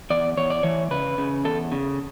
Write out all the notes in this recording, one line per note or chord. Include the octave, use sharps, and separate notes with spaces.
E2 D5
E2 C#5
D5
E3 C#5
C#3 B4
C#3
E2 A4
C#3